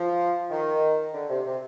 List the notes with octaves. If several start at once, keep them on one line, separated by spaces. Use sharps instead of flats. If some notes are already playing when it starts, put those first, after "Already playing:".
Already playing: F3
D#3
D3
C3
C3